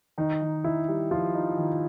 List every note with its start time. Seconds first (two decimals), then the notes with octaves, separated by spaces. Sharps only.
0.18 D#3 D#4
0.41 D#3
0.64 D#3 E4
0.88 G3
1.11 F3 G3 F4
1.35 D#4
1.57 D#3